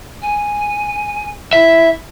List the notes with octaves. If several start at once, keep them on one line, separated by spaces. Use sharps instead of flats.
G#5
E4 E5